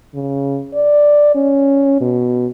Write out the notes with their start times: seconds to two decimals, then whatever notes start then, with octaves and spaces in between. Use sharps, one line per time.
0.14 C#3
0.74 D5
1.35 C#4
2.01 B2